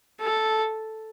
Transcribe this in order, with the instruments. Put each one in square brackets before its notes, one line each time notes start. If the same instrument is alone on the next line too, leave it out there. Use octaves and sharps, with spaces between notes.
[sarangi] A4